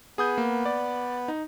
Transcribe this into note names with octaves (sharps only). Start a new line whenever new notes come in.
B3 G#4 D#6 G6
A#3
D5
D#4